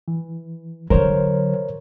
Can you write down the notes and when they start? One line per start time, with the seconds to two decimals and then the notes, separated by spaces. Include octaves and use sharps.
0.08 E3
0.90 D3 F#3 A#4 C5 C#5